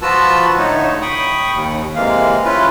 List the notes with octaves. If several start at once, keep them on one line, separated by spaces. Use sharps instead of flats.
F3 F4 F#4 B4 A5 E6
A2 D3 A3 D#4 C#5
G5 B5 C#6 D#6
D#2
C3 E3 G#3 A#3 F5
C#4 E4 F4 B4